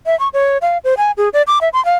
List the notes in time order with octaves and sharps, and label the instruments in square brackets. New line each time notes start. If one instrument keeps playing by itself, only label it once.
[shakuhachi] E5
C#6
C#5
F5
C5
G#5
G#4
D5
D6
E5
C6
F5